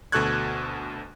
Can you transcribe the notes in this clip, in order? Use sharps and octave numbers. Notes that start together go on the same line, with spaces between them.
D2 B2 A4 C#6 F#6 G#6